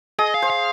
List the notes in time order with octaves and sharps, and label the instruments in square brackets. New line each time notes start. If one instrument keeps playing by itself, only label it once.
[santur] G#4 [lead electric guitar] D#5
[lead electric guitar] F5
[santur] C5
[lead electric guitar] F5